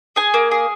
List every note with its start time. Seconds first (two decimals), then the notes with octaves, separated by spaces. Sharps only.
0.16 G#4 G#5
0.34 A#3
0.51 G#4